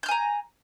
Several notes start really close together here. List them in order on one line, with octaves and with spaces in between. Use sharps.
G6 F6 G#5 A#5